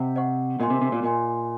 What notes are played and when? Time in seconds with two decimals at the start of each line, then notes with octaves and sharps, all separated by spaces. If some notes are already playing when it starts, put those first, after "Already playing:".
Already playing: C3 D#5 F#5
0.16 C5 D#5 F#5 C#6
0.60 A#2 A#4 D#5 G#5 C6
0.70 C3
0.82 C3
0.92 A#2
1.03 A#2 A#4 D#5 G#5 C6